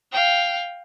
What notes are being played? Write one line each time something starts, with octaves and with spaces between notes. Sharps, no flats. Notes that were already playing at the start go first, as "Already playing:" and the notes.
F5 G5